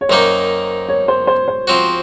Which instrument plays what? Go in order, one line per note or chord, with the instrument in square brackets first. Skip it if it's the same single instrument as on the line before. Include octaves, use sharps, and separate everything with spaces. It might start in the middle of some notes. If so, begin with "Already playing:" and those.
[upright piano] C#5
[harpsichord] F#2 D#3 A#3 D#4 [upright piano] C5
[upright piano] C#5
C5
C5
C5
[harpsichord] F3 C4 F#4